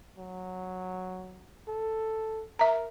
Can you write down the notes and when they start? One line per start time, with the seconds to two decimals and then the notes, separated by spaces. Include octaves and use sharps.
0.18 F#3
1.68 A4
2.59 A#4 E5 A#5